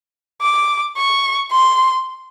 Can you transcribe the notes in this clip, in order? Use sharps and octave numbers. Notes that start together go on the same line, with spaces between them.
D6
C#6
C6